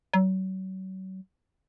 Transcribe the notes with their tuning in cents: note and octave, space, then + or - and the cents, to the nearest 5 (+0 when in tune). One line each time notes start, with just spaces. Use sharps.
F#3 +35